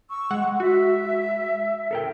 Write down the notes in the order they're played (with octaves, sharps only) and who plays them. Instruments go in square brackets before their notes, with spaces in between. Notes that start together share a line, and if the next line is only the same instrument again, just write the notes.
[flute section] C#6 E6
[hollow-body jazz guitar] G#3 [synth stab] F#5
[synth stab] F#4 [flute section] E5
[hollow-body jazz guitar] A4 A#4 G5